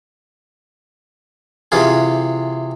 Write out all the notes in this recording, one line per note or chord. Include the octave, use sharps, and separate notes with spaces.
C3 E3 F4 G#4